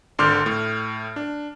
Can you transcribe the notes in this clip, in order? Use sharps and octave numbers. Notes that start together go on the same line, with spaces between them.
G#1 D3 C6 D6 F6 G6
A2
D4